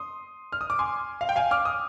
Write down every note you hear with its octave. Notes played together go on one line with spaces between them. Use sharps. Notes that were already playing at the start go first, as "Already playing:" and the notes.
Already playing: C6 D#6
F6
D#6
D6
G#5 C6
F5
G5
F5 G#5
D6 F6
D#6